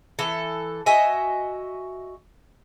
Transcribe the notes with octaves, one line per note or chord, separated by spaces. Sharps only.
E3 A4
F#4 D#5 E5 G#5